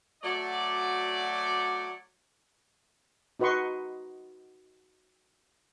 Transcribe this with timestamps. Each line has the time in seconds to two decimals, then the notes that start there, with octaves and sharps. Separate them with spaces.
0.23 F#3 A3 F#4 D5
3.40 D#4 F#4 B4 D#5 C6 C#6